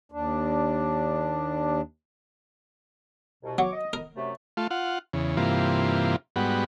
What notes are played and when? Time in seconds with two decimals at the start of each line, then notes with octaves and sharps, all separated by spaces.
0.12 D#2 D4
3.44 C2 B2
3.58 F#3 C#5 C#6 D6
3.73 D#5
3.93 A#4
4.16 F#2 C3 A3
4.57 A3 F4
4.70 F4 F#5
5.13 E2 C#3
5.37 G2 C3 E3 A#3 F4
6.36 G#2 G3 B3 F#4